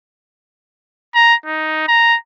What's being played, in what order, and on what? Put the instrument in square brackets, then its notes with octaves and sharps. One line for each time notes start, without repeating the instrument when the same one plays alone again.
[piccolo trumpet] A#5
D#4
A#5